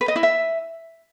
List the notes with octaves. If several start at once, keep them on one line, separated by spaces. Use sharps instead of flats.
B4
D#5
E4
E5